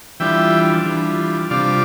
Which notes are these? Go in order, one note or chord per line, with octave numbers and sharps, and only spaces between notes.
E3 G3 D4 F4 E5 G5
E3 G3 D4 F4
C3 G3 D4 F4 D5 F5